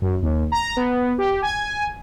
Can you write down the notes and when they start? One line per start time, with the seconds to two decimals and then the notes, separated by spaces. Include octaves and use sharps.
0.02 F#2
0.22 D#2
0.52 A#5
0.77 B3
1.18 G4
1.42 G#5